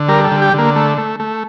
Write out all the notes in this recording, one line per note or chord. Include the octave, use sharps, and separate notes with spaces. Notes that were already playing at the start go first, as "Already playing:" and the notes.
Already playing: D3
G3 A#4
A4
D3
G4
D3 A#3
A3
A3
A3